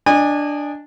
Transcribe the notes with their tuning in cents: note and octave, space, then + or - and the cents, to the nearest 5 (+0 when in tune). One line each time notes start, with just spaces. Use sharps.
D4 +0 D#5 -15 G#5 -25